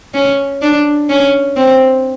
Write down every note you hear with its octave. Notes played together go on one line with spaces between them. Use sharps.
C#4
D4
C#4
C4